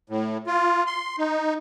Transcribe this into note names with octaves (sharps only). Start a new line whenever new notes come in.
A2
F4
C6
D#4